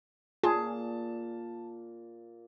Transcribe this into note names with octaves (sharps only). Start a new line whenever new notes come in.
A#2 F4 G#4 A5